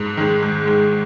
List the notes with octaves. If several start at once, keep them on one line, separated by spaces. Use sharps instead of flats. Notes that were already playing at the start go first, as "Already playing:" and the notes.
Already playing: G#2
D#3 G#3
G#2
D#3 G#3